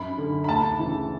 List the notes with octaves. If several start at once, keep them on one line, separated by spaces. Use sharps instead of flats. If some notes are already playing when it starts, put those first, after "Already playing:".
Already playing: F#2 B5
D3
B5
D2 A5
C#3 E3